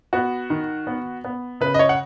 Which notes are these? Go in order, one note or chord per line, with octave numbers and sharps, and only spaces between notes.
B3 F#4
D#3
B3
B3
C#3 B4
D#5
C#5
F#5